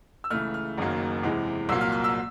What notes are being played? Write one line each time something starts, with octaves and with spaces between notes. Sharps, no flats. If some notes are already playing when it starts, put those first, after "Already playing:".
E6
C#2 C#3 E3 A3 F6
F6
F#1 F#2 D#3 F#3 A#3
E2 C3 E3 G#3
C2 A#2 F#3 A#3 E6
F6
F6
E6